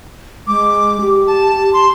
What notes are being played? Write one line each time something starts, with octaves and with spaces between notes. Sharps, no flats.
G#3 D6
G4
A5
C6